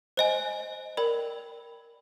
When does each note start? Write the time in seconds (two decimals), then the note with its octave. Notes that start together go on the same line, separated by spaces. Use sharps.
0.17 C5 D#5 G#5
0.97 A#4 D5 G5 B5